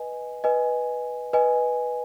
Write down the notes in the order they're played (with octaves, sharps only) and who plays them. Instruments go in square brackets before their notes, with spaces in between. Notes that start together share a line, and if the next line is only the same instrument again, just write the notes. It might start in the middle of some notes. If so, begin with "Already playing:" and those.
Already playing: [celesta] B4 D#5 G#5
B4 D#5 G#5
B4 D#5 G#5